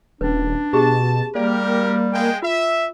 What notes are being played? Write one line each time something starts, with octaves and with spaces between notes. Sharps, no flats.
D#1 C#4 D4 B4
B2 G4 G#4 A5
G3 A#3 G4 A#4 D5
G#3 G5
F4 E5